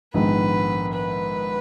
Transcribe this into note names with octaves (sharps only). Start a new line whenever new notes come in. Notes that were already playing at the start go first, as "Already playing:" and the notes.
A#1 G#2 D#3 G#3 B3 B4
B4